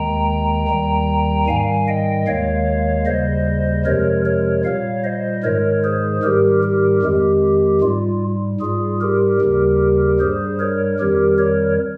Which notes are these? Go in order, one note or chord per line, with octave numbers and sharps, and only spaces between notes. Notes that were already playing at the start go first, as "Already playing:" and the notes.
Already playing: D#2 D#3 G#3 G5 A#5
D#2 D#3 G3
G#2 D#3 G3 F5 G#5
D#5 G5
D#2 D#3 G#3 C#5 F5
D#2 C#3 G3 C5 D#5
F2 C3 F3 G#3 A#4 C#5
A#4 C#5
A#2 G3 C#5 F5
C5 D#5
G#2 D#3 G#3 A#4 C#5
G#4 C5
G#2 D#3 G3 G4 A#4
G4 A#4
F2 D#3 G#3 G4
G#2 G3 F4
G#2 G3 F4 G#4
G4 A#4
D#2 C#3 G3
G2 G3 G#4 C5
A#4 C#5
F2 D#3 G3 G4 A#4
A#4 C#5